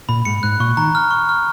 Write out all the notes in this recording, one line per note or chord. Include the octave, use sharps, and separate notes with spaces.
A#2 B5
G#2 C#7
G#2 F#6
A#2 C#6
D#3 A#5
F6
C#6
F6